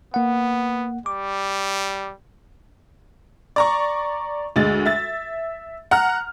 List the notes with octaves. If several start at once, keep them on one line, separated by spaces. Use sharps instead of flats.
A#3 B3 F#5
G3 D6
D5 A#5 C#6
D2 G#3 A6
E5 A6
F#5 A#5 F6